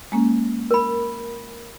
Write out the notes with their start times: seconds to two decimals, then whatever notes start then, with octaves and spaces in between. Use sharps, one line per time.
0.12 G#3 A#3 C#4
0.71 A#4 B5